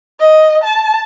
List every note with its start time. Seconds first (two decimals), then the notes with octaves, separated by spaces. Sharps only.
0.20 D#5
0.64 A5